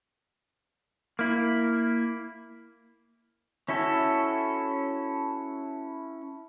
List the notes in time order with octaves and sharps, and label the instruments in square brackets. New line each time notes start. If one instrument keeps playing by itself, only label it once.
[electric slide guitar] A#3 E4
[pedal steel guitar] C#4 E4 F#4 A4